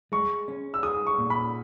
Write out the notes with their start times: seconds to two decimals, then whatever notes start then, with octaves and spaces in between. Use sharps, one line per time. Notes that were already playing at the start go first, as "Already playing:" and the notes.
0.12 G#3 C#6
0.48 C#4
0.74 E6
0.83 G#4 D#6
1.07 C#6
1.19 A#2
1.30 B5